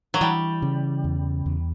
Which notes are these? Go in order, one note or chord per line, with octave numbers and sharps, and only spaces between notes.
F#3
E3 G3
C#3
E2
E2